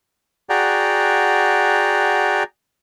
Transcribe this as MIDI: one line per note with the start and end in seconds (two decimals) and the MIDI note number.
0.50 2.43 66
0.50 2.43 68
0.50 2.43 74
0.50 2.43 78
0.50 2.43 79
0.50 2.43 82